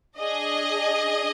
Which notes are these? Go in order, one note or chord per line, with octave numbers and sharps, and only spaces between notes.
D4 G#4 D#5